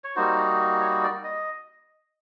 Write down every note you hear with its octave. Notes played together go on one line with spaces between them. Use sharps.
C#5
G3 A#3 D#4 F#4 C5
C#5
D5
D#5